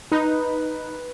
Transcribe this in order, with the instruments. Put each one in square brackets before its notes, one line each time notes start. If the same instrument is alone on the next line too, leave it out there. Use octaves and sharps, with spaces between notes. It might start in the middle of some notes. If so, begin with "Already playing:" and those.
[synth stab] D#4 [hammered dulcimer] B4